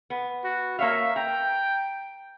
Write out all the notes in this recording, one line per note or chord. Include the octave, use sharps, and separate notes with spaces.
B3
F#4
A#3 C#5 E5 F5
G5 A#5